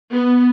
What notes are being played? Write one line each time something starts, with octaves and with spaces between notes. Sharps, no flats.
B3